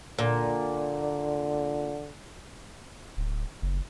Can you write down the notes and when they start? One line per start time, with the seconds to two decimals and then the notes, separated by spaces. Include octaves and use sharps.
0.19 A#2 D3
3.17 D1
3.62 F#1